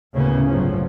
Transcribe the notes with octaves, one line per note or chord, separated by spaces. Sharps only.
D2 A2 C#3 A#3 B3 C#4
G1 F3 F#3